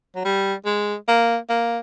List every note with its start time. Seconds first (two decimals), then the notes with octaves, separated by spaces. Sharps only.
0.16 F#3
0.25 G3
0.66 G#3
1.08 A#3
1.49 A#3